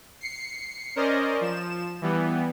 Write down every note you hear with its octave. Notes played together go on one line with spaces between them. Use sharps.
C7 C#7
C#4 A#4 C5 D5 D#5
F3 E7
E3 G3 B3